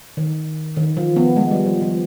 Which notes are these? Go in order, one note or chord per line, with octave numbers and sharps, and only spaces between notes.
D#3
D#3
F3
B3
G#3
G3
F3
F3